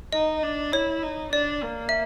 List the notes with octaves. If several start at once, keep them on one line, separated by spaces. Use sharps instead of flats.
D#4 D#5
D4
E4 C#5
D#4
D4 D5
A#3
E5